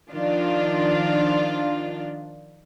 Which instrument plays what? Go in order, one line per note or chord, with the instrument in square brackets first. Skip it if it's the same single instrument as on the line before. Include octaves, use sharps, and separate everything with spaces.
[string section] D#3 F3 D4 F4